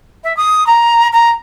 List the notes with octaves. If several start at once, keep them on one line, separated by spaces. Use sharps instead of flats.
E5
D#6
A#5
A#5